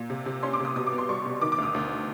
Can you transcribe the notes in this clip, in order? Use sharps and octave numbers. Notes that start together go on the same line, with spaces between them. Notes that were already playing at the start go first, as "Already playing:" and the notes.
Already playing: A#2
C3
C3
C#4 C6
D6
C3 D#6
B2 D#6
D6
B3
C6
G3 C#6
B2
D#3 D6
D6
D2 D#6
D2